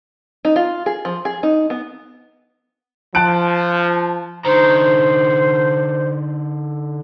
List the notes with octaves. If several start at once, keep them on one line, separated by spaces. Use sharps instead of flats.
D#4
F4
G#4
F3
G#4
D#4
B3
F3 A5 F#6 D7
D3 D#4 C5 A#5